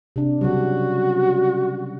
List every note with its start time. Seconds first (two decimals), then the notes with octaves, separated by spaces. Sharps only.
0.16 C3 D4
0.41 C#3 F#3 G3 F#4